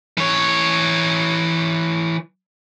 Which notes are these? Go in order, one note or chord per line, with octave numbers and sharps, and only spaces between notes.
E3 C#5